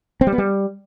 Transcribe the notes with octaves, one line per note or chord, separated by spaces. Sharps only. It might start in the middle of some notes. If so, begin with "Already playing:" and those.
C4
G3
B3
G3